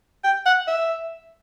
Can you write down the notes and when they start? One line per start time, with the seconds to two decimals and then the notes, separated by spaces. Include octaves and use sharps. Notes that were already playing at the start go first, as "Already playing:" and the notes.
0.24 G5
0.46 F#5
0.68 E5